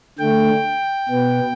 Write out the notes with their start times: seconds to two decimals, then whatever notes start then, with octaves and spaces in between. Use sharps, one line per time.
0.18 D3 A3 G5
1.09 B2 B3